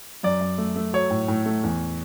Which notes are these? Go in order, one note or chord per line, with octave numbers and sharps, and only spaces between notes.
F#2 D5
F#2
A3
A3
F#3 C#5
A2
A2
A3
E2